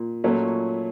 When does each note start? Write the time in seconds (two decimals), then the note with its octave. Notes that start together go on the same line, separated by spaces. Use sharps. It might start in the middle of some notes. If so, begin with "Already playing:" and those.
Already playing: A#2
0.24 A#2 F#3 A3 C#4